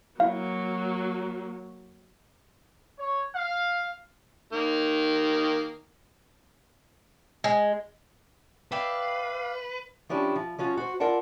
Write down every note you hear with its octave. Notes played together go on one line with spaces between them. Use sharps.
F#3 A#3 E4 F5
C#5
F5
D#3 A#3
G#3
B4 D5 E5 F5 G5
F3 C#4 D4 E4 G4
F3
F3 C#4 F4 F#4
F#4 C5
E4 F4 A#4 D5 F#5 A5